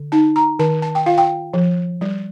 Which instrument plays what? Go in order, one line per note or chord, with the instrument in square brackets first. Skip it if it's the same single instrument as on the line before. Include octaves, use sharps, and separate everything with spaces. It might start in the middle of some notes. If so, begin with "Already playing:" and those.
Already playing: [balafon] D3
D#4 A5
A#5
D#3 A5
A5
G5
F4 F5
G5
F3
G3